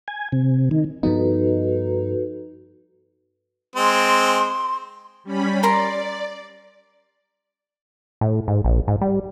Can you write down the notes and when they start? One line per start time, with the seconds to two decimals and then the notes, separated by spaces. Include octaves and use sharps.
0.08 G#5
0.32 C3
0.71 D#3
1.03 G2 F3 B3 D#4 F#4 A4 B4
3.76 G#3 C4 C6
5.24 G3 C#4 B5
5.63 A#4 D5 A#5 C6
8.21 A2
8.48 G#2
8.65 A#1
8.88 G#2
9.02 G3